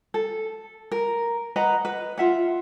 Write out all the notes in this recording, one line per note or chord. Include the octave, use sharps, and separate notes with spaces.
A4
A#4
B4 D#5 F#5 A#5
B4
F4 E5 F#5